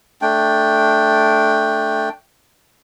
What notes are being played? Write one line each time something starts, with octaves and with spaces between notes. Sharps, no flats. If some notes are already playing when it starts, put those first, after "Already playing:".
A3 D4 G5